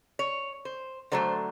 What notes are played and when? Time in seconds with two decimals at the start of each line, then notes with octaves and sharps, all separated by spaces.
0.19 C#5
0.65 C5
1.12 D3 F#3 A3 C5